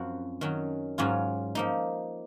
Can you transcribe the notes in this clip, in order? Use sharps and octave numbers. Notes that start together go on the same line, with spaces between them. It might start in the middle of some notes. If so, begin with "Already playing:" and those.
Already playing: F#2 F3 C4 F#4
D#3 F#3 C#4
G#2 F#3 C#4 F4 G#4
F3 A#3 D#4